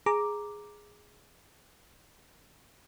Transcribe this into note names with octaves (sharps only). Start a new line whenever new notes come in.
G#4 A#5 D6